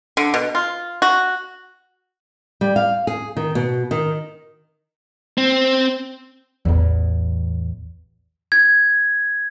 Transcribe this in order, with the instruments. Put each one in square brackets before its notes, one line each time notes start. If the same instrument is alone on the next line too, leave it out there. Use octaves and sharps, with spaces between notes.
[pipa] D3
B2
F4
F#4
[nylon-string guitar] G3
F5
G#4
D#3
B2
D#3
[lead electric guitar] C4
[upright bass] A1 E2
[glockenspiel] G#6